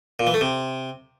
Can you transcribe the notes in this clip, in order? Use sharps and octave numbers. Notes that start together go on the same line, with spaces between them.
A#2
E3
A3
C3